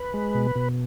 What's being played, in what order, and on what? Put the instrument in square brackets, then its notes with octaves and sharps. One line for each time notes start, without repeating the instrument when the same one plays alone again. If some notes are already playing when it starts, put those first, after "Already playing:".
Already playing: [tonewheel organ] B4
G#3
B2
B2